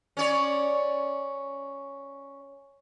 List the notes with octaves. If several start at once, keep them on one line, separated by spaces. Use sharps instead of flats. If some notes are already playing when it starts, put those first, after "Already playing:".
C#4 C#5 D5